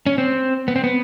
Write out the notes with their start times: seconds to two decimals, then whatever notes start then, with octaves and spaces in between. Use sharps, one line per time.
0.06 C#4
0.18 C4
0.68 B3
0.76 C4
0.84 B3